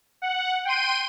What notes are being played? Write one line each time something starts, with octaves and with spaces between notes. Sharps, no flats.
F#5
G5 C6 D#7